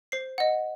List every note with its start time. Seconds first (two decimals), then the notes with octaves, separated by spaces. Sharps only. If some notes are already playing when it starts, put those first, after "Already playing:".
0.12 C5 C7
0.38 D#5 F#5